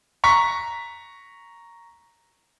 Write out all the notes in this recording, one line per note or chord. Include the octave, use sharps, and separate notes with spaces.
A#5 C#6 B6